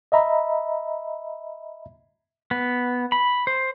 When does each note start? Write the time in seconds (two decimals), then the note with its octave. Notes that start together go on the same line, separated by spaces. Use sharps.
0.12 D#5 E5 A#5 B5
2.51 B3
3.12 B5
3.47 C5